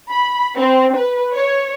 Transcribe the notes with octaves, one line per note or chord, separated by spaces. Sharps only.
B5
C4
B4
C#5